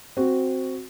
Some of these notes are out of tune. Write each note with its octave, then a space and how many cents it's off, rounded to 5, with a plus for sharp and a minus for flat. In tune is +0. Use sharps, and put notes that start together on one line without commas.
C4 +0 F#4 +0